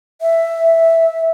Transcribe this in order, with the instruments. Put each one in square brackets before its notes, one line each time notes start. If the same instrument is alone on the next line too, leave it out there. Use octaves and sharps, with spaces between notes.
[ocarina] E5